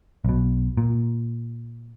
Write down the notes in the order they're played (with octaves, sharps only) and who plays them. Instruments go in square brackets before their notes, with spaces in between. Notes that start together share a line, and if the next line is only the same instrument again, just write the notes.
[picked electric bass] B1 B2
A#2